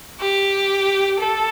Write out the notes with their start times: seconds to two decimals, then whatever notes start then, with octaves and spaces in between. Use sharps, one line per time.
0.20 G4
1.19 A4